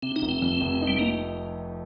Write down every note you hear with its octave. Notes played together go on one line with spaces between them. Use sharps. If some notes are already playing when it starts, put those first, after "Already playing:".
C3 C4
D#4
F1
C4
F2
F1
D#4
G3
A#3 D#4